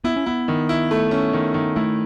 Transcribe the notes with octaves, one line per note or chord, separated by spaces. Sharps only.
B3 E4
C#4
B3 E4
D#3
E4
A3
C#4
D#3
D#3
A3 E4